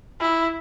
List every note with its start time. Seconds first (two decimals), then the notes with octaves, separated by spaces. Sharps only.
0.21 E4